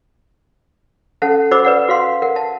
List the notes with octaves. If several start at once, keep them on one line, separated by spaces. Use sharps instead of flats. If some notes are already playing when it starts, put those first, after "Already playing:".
C#4 A4 F#5 A5
F#4 C5 D#5 B5 D6 E6
B4 D5 F#5
F#4 F5 C6
A#4 F#5
A5